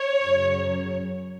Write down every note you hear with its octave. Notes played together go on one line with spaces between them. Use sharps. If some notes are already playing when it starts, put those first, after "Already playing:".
Already playing: C#5
F#2 C#3 F#3